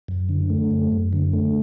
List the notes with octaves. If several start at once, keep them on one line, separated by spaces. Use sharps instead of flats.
F#2
D3
A3
F#2
F#2
D3
A3